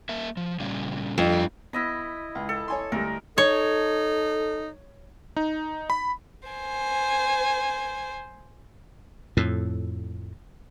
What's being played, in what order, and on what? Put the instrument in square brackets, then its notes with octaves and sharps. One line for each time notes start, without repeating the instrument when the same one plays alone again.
[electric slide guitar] A#3 A#4 E5
F3
A#2 C#3 G3
[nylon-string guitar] F2 [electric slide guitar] G3 A3 D4
[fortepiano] B3 [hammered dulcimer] E4 D#5 B5
[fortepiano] C#2
[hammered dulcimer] A4
[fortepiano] C#5 G#5 C6
[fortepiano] D2 G3 [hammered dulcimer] A#4
[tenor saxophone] D#4 [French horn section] A4 [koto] C#5
[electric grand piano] D#4
B5
[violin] C5 G#5
[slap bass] F2 A2